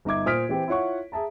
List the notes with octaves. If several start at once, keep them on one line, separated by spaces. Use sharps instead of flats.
G1 D#4 E5 D6 G#6
A#2 C5 D#6 F6 B6 D7
E3 C4 G4
E4 F4 C#5 F#5 C#6
G#4 E5 A5 A#5